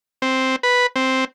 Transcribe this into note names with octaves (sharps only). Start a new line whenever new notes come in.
C4
B4
C4